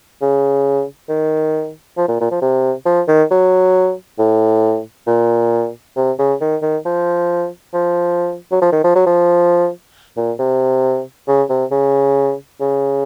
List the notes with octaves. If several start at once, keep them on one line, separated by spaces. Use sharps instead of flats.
C#3
D#3
F3
A#2
A#2
F3
C3
F3
D#3
F#3
A2
A#2
C3
C#3
D#3
D#3
F3
F3
F#3
F3
D#3
F3
F#3
F3
A#2
C3
C#3
C3
C#3
C#3